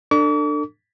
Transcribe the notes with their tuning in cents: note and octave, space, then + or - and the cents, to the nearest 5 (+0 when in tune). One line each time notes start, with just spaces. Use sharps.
D4 +25 A4 +35 D6 -45